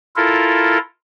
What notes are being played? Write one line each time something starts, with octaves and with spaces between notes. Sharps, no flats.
E4 F4 A4 A#4